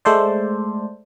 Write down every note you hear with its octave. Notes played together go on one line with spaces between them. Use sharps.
G#3 A3 A4 C5 D5